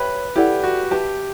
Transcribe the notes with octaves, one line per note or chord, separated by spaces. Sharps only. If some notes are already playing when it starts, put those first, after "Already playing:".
Already playing: G4 B4 C#5 E5 B5
E4 G4 A4 D5 F#5
F#4
G4 B4 E5 A5